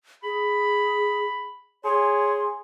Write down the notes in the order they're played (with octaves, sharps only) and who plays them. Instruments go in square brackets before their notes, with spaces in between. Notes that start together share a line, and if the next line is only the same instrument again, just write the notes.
[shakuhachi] G#4 [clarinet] B5
[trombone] G#4 [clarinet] C#5 [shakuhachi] C6